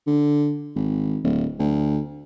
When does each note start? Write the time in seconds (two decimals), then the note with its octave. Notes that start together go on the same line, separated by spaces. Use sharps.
0.07 D3
0.76 G#1
1.24 D1
1.59 D2